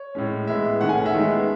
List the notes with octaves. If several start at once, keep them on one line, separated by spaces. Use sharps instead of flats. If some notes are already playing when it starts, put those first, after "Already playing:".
Already playing: C#5
A2 G#3 C#4
A2 G#3 B3 E5
D#3 A3 C#4 F#5
G#5
F#5
E5
D#3 G#3 B3